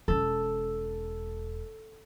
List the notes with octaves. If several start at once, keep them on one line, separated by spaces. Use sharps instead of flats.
E1 C#4 A4